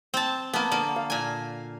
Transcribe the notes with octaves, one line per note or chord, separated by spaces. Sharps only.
C4 A5
A#3 B3 A5
D3 A#3
F5
A#2 G#5